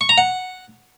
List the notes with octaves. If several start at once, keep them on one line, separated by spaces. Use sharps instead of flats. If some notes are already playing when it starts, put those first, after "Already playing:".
C#6
A#5
F#5